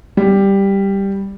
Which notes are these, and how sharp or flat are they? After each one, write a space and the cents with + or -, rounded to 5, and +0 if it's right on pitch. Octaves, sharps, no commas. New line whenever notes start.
G3 +5